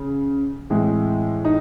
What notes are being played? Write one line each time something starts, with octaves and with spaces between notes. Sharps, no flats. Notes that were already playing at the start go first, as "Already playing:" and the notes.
Already playing: C#3
A2 E3 G#3 C4
D#4